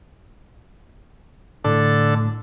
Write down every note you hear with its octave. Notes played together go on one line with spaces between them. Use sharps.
A2 D3 A4